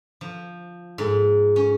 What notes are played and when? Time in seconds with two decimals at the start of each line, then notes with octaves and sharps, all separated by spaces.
0.21 F3
0.98 G#2
1.56 C#4